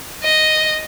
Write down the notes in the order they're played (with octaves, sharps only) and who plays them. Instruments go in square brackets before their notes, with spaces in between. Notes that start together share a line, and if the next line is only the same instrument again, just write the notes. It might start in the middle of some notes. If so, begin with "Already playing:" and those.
[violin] D#5